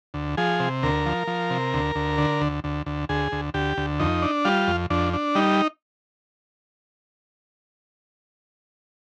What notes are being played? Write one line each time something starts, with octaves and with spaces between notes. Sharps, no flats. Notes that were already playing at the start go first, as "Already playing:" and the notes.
D2
F3 G#4
C3
D2 A#4
F3
F3
C3
D2
D2
D3
D2
D2
D2
D2 G#4
D2
D2 G4
D2
F2 D#4
D4
G3 F4
F2
F2 D4
D4
G3 D#4